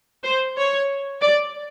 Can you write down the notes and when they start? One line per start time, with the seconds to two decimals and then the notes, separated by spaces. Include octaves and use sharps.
0.24 C5
0.57 C#5
1.21 D5